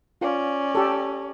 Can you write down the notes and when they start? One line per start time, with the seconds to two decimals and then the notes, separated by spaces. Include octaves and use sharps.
0.21 C#4 F4 D5
0.75 G4 A4